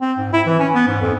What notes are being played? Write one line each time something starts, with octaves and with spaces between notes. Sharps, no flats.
C4
G#2
E4
E3
C#4
B3
G#2
F2